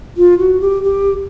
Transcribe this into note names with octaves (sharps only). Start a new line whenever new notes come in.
F4
F#4
G4
G4